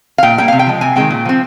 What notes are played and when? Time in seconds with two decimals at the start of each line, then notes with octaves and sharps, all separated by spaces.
0.18 F5
0.23 A#2 G5
0.38 G3 A#3 G5
0.48 C3 F5
0.59 G5
0.67 F3 G#3
0.81 C3 G#5
0.96 D#3 G#3 C4 G5
1.11 A#2
1.26 F3 C4